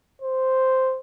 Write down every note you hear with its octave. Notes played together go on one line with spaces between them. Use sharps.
C5